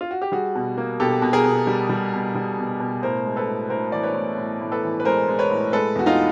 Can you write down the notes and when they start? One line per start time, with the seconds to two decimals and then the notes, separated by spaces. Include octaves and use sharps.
0.01 F4
0.11 F#4
0.22 G4
0.32 G3 F#4 G#4
0.55 B2
0.78 A#3
1.00 B2 G4 A4
1.22 B2
1.33 G#4 A#4
1.45 B2
1.67 G3
1.89 G3
2.13 B2
2.35 G3
2.58 B2
2.80 B2
3.02 A2 A#4 C5
3.25 G#3
3.36 A4 B4
3.47 A2
3.70 A2 A#4 C5
3.92 E3 D5
4.03 B4 C#5
4.15 A2
4.38 A2
4.61 A2
4.72 A4 B4
4.83 E3
5.00 B4
5.05 G#3 A#4 C5
5.28 G#3
5.39 B4 C#5
5.50 A2
5.73 G#3 A4 B4
5.95 E2 F#4
6.06 D#4 F4